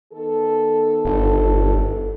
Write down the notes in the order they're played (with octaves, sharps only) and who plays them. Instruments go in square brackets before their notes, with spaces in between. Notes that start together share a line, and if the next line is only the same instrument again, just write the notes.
[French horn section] D#3 B3 A4
[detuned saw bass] G1